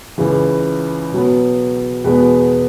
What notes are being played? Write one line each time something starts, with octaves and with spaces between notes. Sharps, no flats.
C#2 C#3 E3 B4
B2 F#3 B3
E2 B2 G#3 B3 B4